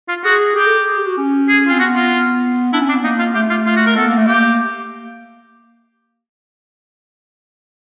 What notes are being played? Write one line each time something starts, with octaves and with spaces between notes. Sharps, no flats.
F4
F#4 G#4
G4 G#4
A4
G#4
G4
F#4
C#4
G#4
C4 F4
B3 F#4
F4
D4 E4
C#4
C4 D4
B3
A#3 D#4
F4
A3 G4
F4
F4
F#4
A#4
B3 A4
A#3
A3
A#3 G4